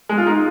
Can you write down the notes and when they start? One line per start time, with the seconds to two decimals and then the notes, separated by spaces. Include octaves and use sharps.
0.09 G#3
0.18 F4
0.27 D#4